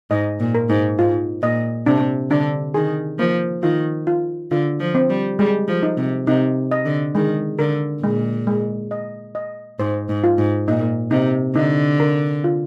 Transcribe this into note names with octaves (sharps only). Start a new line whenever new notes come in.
G#2 D#5
A#2
A#4
G#2
G#2 F4
A#2 D#5
C3 D4
D3 D4
D#3 G#4
F3 A#3
D#3 F4
F4
D3 F4
F3
C4
G3
G3 G#3
F3
D#4
C3
C3 D#4
D#5
D3
D#3 G#3
D3 A#4
A#2 G#3
G#3
D#5
D#5
G#2 C5
G#2
F4
G#2
A#2 D#4
C3 D#4
D3 D#4
A#4
F4